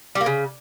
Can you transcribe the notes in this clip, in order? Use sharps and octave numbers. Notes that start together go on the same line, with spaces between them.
G3
A#3
C#3